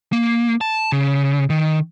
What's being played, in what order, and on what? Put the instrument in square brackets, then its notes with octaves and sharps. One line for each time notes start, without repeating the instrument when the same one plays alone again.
[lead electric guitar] A#3
A5
C#3
D#3